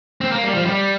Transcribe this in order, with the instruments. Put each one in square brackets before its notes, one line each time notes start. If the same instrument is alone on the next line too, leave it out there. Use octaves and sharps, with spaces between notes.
[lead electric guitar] C4
A#3
G3
F3
G3